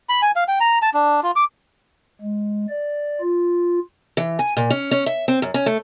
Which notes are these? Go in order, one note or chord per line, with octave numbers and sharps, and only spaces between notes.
B5
G#5
F5
G5
A#5
A5
D4
F4
D6
G#3
D5
F4
E3
G#5
A#2
C#4
C#4
E5
C4
F#2
C#4
A3